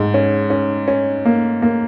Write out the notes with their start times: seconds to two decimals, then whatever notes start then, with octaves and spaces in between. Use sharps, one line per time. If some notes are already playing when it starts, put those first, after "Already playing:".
Already playing: G#2
0.14 C#4
0.50 C#4
0.88 C#4
1.25 A#3
1.62 A#3